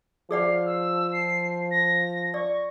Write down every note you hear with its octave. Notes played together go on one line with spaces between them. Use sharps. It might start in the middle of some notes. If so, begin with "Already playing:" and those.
F3 G#4 D5 F5 F#5
E6
C7
A#6
D5 C#6